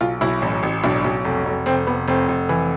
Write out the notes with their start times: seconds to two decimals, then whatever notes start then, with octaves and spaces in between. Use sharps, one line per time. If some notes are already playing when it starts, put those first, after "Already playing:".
0.01 B1 F4
0.21 B1 E4
0.42 A1
0.63 A1
0.83 B1 D4
1.04 B1
1.24 F1
1.45 F1
1.66 F1 C4
1.87 F1 B3
2.07 F1 C4
2.28 F1
2.49 E3